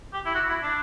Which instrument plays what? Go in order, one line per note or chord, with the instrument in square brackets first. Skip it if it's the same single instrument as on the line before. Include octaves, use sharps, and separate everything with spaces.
[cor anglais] G4
E4
F#4
E4
D4